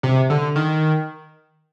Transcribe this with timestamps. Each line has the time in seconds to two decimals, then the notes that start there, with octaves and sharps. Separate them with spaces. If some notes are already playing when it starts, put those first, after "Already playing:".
0.03 C3
0.30 D3
0.56 D#3